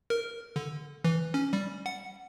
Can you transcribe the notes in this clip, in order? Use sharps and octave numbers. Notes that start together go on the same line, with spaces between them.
A#4
D3
E3
C#4
G3
F#5